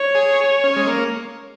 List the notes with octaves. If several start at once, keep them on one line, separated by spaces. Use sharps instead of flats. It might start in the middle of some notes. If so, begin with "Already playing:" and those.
Already playing: C#5
G#4
C#4
G#3
A#3